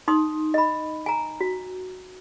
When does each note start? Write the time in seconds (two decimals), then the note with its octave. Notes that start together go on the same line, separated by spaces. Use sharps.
0.08 D#4 C6 D#6
0.54 D#5 B5
1.06 G#5 A#5
1.41 F#4